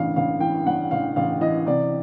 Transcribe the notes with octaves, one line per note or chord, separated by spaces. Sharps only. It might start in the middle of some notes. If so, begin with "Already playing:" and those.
Already playing: A1 G2 E3 F5
A1 F5
E3 G5
G2 F#5
A1 F5
A1 F5
E3 D#5
C3 D5